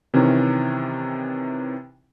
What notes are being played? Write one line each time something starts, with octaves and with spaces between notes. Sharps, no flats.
C3 D#3 E3 C#4